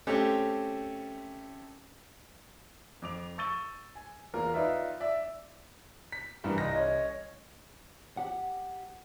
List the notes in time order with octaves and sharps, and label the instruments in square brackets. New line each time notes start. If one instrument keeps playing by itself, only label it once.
[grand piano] A3 C4 C#4 G4 A4
F2 D6 F7
C#6 E6 A6 D#7 G7
G#5
E2 A#3 F4 A#4
D#4 F4 B4 D5 E5
D5 E5
B6
[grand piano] G2 E3 G3 [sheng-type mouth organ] B3 A#4
[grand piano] C2 A#6 [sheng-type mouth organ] D#4 F4
[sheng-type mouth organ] C#4 C#5 [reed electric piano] D#5
[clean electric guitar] G4 F#5